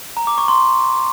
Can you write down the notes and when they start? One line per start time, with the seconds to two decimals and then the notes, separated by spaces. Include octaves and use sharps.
0.17 A#5
0.27 D6
0.38 C#6
0.48 C6